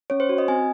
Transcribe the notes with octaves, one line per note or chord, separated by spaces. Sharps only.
C#4 C#5
C5
F#4
D#5
C4 G#5